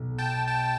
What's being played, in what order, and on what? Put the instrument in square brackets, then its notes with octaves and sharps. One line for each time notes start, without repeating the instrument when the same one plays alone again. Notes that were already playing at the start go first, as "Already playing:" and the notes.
Already playing: [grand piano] B1 B2
[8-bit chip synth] G5 A5
G5 A5